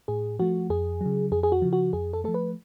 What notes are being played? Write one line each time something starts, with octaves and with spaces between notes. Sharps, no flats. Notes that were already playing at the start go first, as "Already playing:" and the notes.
A2 G#4
F3 A3 F#4
F2 G#4
C#3 F#3
F2 G#4
G#4
F#4
C#3 F3
F#4
F2 G#4
A4
F3 A3 A4
B4